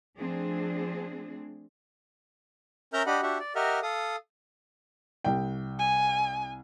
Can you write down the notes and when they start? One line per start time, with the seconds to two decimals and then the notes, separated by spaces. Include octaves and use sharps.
0.17 F3 A3 C4 D4 G#4
2.93 C#4 A#4 E5 A#5 F6 G6
3.06 D4 G4 D#5 F#5 B5
3.23 D4 F#4 G4 E5 F#5
3.39 D5
3.55 G4 A#4 D#5 E5 F#5 F6
3.83 A4 F5 D#6
5.24 C2 G5
5.79 G#5